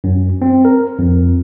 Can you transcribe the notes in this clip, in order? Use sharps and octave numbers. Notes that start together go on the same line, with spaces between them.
F#2
C4
A#4
F2